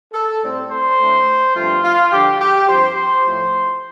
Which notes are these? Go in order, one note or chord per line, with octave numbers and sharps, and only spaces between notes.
A4
A2 G3 C4
C5
A2 A3 D4
G2 F3 A3 C4 F4
F4
D3 F3 D4 G4
G4
G2 F3 C4 C5
C5
A2 F3 A3